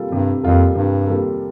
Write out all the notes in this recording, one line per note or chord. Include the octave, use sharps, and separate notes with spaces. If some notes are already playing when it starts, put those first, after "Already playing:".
Already playing: C3 G3 A#3 F4 A4
G2 C3
F2 G3 A#3 F4 A4
G2 C3
G3 A#3 F4 A4